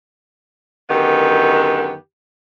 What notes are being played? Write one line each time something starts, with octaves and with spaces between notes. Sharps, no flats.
F#2 D3 D#3 B3 G4